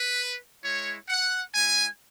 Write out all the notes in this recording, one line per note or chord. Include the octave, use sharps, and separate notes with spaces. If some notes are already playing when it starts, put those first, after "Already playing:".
Already playing: B4
G#3 E4 C#5
F#5
G#3 E4 G#5